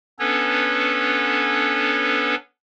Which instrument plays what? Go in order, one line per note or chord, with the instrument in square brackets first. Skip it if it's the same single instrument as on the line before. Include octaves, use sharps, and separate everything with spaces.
[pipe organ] B3 C#4 D4 A4 B4 C#5